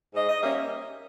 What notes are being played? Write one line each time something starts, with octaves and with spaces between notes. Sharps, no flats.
G#2 D#5
D#5
G3 A#3 C#4 E5